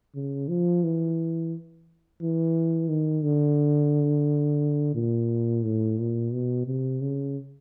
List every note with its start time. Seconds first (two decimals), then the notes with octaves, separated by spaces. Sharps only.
0.15 C#3
0.49 F3
0.84 E3
2.21 E3
2.89 D#3
3.24 D3
4.95 A#2
5.63 A2
5.99 A#2
6.33 B2
6.67 C3
7.01 C#3